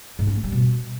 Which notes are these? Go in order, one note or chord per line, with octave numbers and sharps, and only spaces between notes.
G#2
C#4
A3
G3
B2